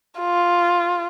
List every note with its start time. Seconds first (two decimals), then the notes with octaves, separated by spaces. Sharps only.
0.20 F4